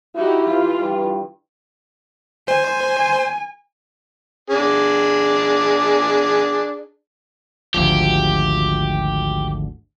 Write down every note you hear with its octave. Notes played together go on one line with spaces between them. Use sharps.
D#4 E4 F#4 G4
E3 F4
G2
C5 G#5
D4 G#4
G#1 D2 F3 G4